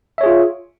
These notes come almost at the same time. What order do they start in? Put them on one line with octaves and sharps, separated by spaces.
E5 C#5 G#4 F4